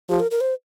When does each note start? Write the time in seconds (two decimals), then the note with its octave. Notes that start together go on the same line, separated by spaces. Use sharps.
0.09 F3 G4
0.20 A#4
0.31 A#4
0.41 C5